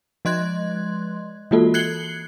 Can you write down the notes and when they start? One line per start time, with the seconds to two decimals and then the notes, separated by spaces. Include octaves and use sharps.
0.25 F3 G#3 D#5 C6 F#6 G#6
1.51 E3 G#3 A#3 F4 F#4 A4
1.74 F#6 G#6 C7 C#7 F#7 G7